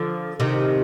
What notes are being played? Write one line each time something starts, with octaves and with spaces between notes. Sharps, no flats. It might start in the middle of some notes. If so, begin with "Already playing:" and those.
Already playing: D3 F3
C3 D#3